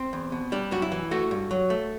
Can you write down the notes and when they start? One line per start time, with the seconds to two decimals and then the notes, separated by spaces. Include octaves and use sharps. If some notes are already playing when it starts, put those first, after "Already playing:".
Already playing: C4
0.13 E2
0.32 B2
0.52 G3 D4
0.71 F#2 F#4
0.82 E4
0.92 E3
1.11 A3 F#4
1.31 G2
1.51 F#3
1.70 A3